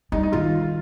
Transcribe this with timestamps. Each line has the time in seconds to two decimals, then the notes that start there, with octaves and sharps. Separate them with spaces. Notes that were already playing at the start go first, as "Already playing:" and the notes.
0.12 G3 D#4
0.23 D#4
0.32 D#3 F4